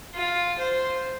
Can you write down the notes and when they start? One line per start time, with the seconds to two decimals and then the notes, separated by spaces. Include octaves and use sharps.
0.14 F4
0.58 C5